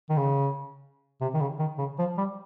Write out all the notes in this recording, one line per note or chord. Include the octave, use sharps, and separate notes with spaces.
D#3
C#3
C3
D#3
C#3
D#3
C#3
F3
G3